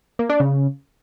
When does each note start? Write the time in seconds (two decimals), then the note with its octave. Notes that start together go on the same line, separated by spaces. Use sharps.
0.19 A#3
0.30 D4
0.40 C#3